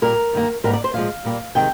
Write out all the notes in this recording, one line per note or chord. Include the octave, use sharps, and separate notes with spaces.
A#2 G3 A#3 A#4
G2 D#3 A#3
G#2 G3 A#3 A#4
D5
C5
A#2 F3 G#3 F5
A#2 G3 A#3
C3 D#3 G#3 G5